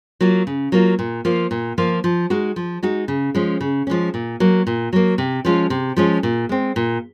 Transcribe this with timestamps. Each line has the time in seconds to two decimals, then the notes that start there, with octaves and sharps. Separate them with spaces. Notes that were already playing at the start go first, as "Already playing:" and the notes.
0.21 F#3 A#3 F4
0.47 C#3
0.72 F#3 A#3 F4
0.99 A#2
1.25 F3 A#3 F4
1.51 A#2
1.78 F3 A#3 F4
2.04 F3
2.30 G#3 D#4 F#4
2.56 F3
2.83 G#3 D#4 F#4
3.08 C#3
3.34 F3 G#3 C#4
3.61 C#3
3.87 F3 G#3 C#4
4.14 A#2
4.40 F#3 A#3
4.67 A#2
4.93 F#3 A#3
5.18 C3
5.45 F3 G#3 C#4 F4
5.70 C3
5.96 F3 G#3 C#4 F4
6.23 A#2
6.49 G#3 C4
6.76 A#2